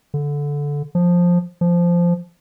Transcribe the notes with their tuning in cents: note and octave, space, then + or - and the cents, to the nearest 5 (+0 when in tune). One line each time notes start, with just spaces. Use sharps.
D3 -15
F3 +10
F3 -10